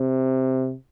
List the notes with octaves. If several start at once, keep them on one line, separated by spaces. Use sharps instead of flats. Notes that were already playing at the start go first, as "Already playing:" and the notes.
Already playing: C3